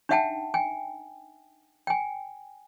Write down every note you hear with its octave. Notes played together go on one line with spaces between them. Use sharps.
D4 D#4 E5 F#5 G5 A5
G5 G#5
G5 G#5